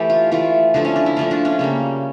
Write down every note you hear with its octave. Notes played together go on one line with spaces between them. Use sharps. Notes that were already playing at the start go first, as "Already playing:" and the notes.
Already playing: E3 A3 G4
F4
E3 A3 F4
D3 F3 A3 D4
C#4
D4
E4
D3 F3 A3 F4
D4
C#4
C#3 G3 A#3